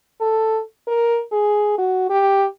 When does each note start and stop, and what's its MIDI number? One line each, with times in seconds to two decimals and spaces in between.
0.21 0.61 69
0.88 1.20 70
1.32 1.74 68
1.78 2.09 66
2.09 2.45 67